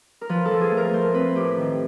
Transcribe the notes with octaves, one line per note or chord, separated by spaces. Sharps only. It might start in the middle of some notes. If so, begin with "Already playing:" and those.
A#4
F3 B4
A4
F3
G#4
A3
A#4
A3 C5
C4 B4
A2 G4
D#3